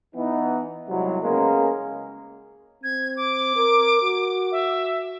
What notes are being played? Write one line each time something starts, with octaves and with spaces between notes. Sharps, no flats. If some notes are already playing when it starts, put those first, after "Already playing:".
E3 B3 D#4
C2 F#3 G#3
C#3 G#3 A#3 B3 C#4 A#4
C4 G#6
D6
A#4
F#4
E5